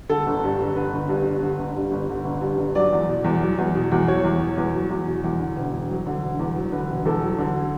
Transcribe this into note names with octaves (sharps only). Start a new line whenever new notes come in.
D3 A4
G1
G2
G1
D3 B4
G1
G2
G1
D3
G1
G2
G1
D3
G1
G2
G1
F#3 D5
E2
B2
E2
F#3
E2
B2
E2
F#3 C#5
E2
B2
E2
F#3
E2
B2
E2
D3
E1
E2
F#3
D3
E1
E2
F#3
D3 B4
E1
E2 A4
F#3
D3